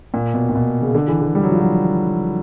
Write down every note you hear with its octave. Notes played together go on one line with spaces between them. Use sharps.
A#2
B2
A#2
B2
C#3
D3
E3
E3
G3
F#3
F3
F#3